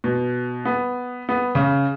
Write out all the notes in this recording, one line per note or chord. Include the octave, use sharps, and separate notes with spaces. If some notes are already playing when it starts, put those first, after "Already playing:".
B2
B3
B3
C#3